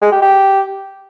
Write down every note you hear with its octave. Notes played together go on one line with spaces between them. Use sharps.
G#3
G4
G4